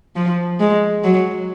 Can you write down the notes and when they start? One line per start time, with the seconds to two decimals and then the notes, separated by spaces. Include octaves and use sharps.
0.16 F3
0.60 G#3
1.04 F#3